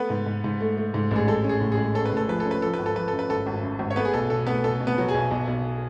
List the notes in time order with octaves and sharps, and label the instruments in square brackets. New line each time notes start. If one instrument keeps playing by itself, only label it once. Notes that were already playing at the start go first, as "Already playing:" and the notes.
Already playing: [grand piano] A3 [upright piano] B3 B4
[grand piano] G#2
G#2
G#2
A3
A3
G#2
[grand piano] A1 [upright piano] G#4
[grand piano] G#3 [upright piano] A4
[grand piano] C#4
[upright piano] G#4
[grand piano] A2
[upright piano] G#4
[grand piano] G#3
[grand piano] C#4 [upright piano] A4
[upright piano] B4
[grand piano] A2 [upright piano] A4
[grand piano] F3 [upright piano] B4
[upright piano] A4
[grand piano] C#4
[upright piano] B4
[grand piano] F3 [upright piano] A4
[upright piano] B4
[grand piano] G#1
[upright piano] A4
[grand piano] F3 [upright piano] B4
[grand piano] F#2 [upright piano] A4
[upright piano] B4
[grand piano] G#1 [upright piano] A4
[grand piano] G#1
F#2
G#1
[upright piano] C#5
[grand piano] A3 [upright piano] B3 B4
[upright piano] G#4
[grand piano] B1 [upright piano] A4
[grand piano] B2 [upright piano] A4
[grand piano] A3 [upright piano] B3 B4
[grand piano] B2 [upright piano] A4
[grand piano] B2
[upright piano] B3 B4
[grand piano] F#3
[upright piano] G#4 G#5
[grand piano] B1
B1
B1